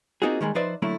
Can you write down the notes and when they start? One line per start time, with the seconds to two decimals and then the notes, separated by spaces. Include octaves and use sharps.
0.22 A#3 C4 D#4 F4 F#4 G#4
0.41 D#3 G3 G#3 A#3
0.55 F3 D#4 B4 C5 D5 E5
0.82 D3 F#3 A3 A#3 E4